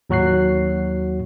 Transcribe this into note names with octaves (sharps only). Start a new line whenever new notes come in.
D#2 F#3 F#4 F#6 C7